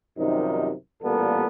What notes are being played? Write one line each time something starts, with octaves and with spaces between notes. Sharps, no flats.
F#2 C3 D#3 F3 G3 D#4
A1 A#2 G3 A#3 B3 A4